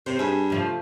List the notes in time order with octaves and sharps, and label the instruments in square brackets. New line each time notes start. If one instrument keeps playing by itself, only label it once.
[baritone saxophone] C3 [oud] C5
[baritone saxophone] G2 [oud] G#4 E5
[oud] C3 F3 A3